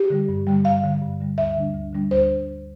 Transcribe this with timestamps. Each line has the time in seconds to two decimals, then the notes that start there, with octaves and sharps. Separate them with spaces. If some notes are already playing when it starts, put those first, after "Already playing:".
Already playing: G4
0.10 D3 G3
0.29 G2
0.47 D3 G3
0.64 G2 F5
0.83 D3 G3
1.01 G2
1.21 D3 G3
1.38 D2 E5
1.56 D3 G3 D4
1.74 D2
1.93 D3 G3 D4
2.11 D2 C5